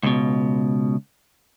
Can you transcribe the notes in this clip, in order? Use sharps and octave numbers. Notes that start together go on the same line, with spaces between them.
C#2 B2